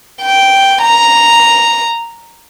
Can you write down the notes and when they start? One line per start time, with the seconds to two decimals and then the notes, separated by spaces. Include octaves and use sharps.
0.22 G5
0.82 A#5